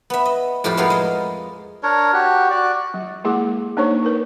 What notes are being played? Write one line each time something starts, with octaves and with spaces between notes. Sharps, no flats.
B3 E5
D#5
F2 A2 A3 F4 G4
G#3 A3 B3 F4 G#4 A#4
G#3 D#5
D4 A#4 C#5
F#4 G4
F#4 D5
F#3
G#3 A#3 E4 G#4 F#5 D6
A#3 D4 D#4 C5 C#5 C#6
D#4 A#4 B4